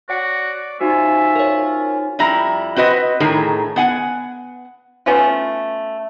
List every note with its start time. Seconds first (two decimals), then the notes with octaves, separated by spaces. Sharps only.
0.09 F#4 C#5 D5 F#5 D6 C#7
0.80 C#4 D#4 F4 F#4 C5 E5
1.35 A#4 C#5
2.19 F2 G3 E4 A#5
2.76 C4 F#4 B4 D#5
3.20 A2 D#3 G#4 A#4
3.76 B3 F#5 G#5
5.06 A3 B3 C#4 F4